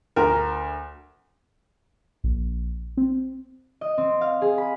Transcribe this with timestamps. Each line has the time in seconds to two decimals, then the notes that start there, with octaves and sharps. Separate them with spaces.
0.16 D2 A#4
2.24 A#1
2.97 C4
3.81 D#5
3.98 C4
4.21 F5
4.42 G#4
4.58 B5